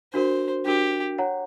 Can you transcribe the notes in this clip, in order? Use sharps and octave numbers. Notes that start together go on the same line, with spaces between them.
D4 F#4 A#4 C5
D4 F#4 G4 A#4
C#5 F#5 A#5